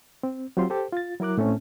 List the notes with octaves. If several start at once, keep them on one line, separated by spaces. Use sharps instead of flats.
C4
F#3 C4 F4 G4 C6
G4 A4 C5
F4 A6
F#3 E4 A#4 D6 F#6
A2 A3 C4 C#4